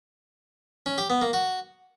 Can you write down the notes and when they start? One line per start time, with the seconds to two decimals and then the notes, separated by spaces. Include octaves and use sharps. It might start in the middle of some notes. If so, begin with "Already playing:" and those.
0.86 C#4
0.98 G4
1.10 B3
1.22 A#3
1.33 F#4